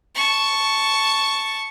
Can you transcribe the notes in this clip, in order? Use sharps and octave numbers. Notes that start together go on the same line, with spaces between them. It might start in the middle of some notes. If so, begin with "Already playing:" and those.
A5 C#6